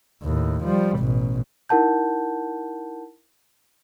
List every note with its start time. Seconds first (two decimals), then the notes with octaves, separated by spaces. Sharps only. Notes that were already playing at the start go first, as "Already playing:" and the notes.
0.23 D#2 A2
0.64 F3 G3
0.98 A1 B2
1.69 D#4 E4 A#4 F#5 A5 G6